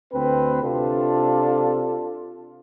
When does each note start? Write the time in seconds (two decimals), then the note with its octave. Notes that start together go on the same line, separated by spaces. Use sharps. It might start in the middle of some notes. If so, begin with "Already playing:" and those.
0.13 D2 C4 B4
0.62 C3 D4 F4 A4